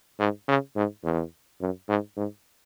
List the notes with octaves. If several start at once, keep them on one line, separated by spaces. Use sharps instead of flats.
G#2
C#3
G#2
E2
F#2
G#2
G#2